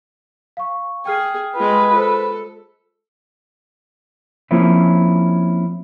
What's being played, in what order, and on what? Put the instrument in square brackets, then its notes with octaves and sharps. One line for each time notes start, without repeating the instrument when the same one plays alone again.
[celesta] F5 C#6
[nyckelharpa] G#4 [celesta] G5 F6 C7
[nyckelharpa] G#3 F4 [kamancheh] B4
[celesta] F4 C5 [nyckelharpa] A4
[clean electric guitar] F3 A#3 C4 C#4 E4 F4